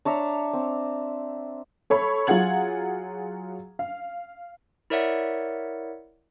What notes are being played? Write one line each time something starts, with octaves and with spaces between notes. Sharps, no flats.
D4 C#5 E5 A#5
C4
A4 C#5 B5 C#6
F#3 F4 G#4 F#5 G#6 F#7
F5
E4 A#4 C#5 D5 E5 F#5